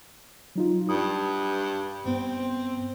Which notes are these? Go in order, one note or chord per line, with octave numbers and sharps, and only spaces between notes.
F#3 D#4 F4
G2 D#6
G2 B3 C4